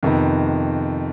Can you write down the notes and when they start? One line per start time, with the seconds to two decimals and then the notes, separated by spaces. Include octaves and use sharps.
0.03 F2 C3 D#3 B3 D#4